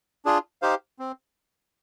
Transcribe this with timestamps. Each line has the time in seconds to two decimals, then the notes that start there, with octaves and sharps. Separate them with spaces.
0.25 D4 F4 G#4
0.62 D#4 G4 C5 F5
0.99 C4